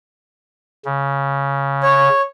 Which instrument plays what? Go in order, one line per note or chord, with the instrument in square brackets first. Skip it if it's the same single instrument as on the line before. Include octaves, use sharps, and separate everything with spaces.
[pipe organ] C#3
[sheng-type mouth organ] C#5